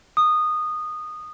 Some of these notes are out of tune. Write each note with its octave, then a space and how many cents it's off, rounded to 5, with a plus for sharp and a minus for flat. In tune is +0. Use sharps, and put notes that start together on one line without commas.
D#6 -15